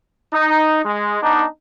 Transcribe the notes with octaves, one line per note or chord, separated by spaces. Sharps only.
D#4
G#3
B3 D4 D#4